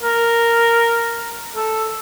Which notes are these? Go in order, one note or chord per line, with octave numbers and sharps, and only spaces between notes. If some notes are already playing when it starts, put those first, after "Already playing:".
A#4
A4